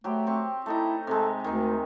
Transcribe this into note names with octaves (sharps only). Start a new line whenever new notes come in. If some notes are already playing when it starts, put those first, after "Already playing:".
F#3 A3 G4 C5
C4 C#6
A3 D#4 E4 A#5
C3 G#3 A4
D2 D#3 D#4